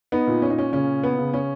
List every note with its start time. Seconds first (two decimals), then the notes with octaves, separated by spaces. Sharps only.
0.12 B3 D#4
0.27 A#2
0.42 C#4
0.50 D#4
0.58 C#4
0.73 C#3 C#4
1.03 B3
1.18 C#3
1.34 C#4